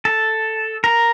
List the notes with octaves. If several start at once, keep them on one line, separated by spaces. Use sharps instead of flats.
A4
A#4